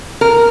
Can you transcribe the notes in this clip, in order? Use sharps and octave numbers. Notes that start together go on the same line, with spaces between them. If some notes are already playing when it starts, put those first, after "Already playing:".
A#4